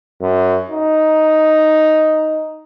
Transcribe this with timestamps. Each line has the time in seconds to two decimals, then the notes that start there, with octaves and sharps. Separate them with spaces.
0.22 F#2
0.71 D#4